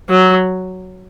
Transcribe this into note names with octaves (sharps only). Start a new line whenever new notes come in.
F#3